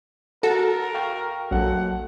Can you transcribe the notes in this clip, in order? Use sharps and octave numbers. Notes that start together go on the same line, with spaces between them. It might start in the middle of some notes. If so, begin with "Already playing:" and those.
F#4 A4 A#4
F5 G5 C#6
A#1 F#3 A4 F#5